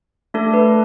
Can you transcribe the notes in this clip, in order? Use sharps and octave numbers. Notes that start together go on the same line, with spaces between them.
A3 D4 A4
B4